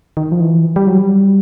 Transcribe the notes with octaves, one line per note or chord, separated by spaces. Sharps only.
D#3
F3
E3
G3
F#3
G3